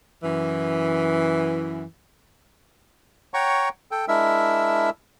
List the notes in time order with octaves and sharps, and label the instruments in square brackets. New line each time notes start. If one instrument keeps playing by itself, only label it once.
[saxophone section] F#2 E3
[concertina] C#5 F#5 G5 A#5 C#6
A4 G5
G#3 D4 E4 A#4 E5 E6